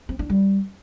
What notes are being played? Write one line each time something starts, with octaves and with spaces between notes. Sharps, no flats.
C4
D4
G3